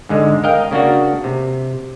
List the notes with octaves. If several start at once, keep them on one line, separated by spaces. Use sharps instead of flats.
G#2 D3 G#3
A#4 D#5 F5 G5
C#3 A#3 D4 F#4
C3